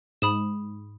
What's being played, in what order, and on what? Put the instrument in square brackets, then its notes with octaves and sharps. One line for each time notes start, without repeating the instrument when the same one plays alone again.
[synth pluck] G#2 [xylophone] B5 D#6 E7